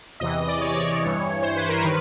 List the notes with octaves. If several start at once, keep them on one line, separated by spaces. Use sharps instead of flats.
E2 C3 E3 D#5
D#5
D5
C#5
G2 E3
C5
B4
A#4
D#3 B4